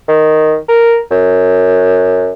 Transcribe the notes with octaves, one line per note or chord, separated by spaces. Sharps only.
D#3
A#4
F#2